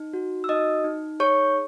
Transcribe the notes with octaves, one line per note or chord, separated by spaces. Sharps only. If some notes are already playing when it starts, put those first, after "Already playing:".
Already playing: D#4
F#4
E6
D#4 D#5 D#6
D#4
G#4 C#5 C#6